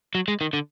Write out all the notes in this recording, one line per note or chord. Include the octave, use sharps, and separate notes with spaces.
F#3
G#3
D#3
D3